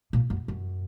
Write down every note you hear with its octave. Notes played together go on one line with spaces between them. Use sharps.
A#2
F#2
F#2